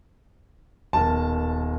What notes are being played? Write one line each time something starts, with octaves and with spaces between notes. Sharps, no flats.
D#1 B2 A#4 A5